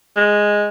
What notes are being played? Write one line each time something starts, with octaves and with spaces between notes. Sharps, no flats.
G#3